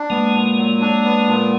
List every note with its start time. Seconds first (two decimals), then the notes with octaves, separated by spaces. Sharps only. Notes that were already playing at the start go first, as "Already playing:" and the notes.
Already playing: D4
0.10 G#3 A#3 B3
0.34 A#2
0.57 F#3
0.81 D4
1.04 B3
1.28 A#2